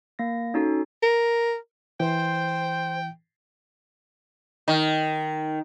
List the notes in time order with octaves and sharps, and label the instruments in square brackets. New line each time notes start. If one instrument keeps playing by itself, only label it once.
[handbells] A#3 A#6
C#4 D#4 F#4 A4
[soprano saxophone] A#4
[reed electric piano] E3 [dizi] C5 [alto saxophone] G5
[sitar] D#3